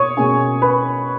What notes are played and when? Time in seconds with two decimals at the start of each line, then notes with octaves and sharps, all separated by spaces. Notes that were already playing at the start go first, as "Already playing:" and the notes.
Already playing: B2 A#3 C#5 C#6 D#6
0.17 B2 A#3 C#4 G#4 G#5
0.62 B4 B5